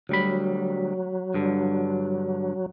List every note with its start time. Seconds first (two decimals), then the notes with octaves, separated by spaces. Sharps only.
0.09 D2 F#3 G3 B5
1.34 G2 D3